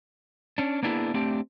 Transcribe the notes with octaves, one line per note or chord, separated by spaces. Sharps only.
C#4 D4
A#3 B3 D4 E4 G#4
A3 C4 D4 G4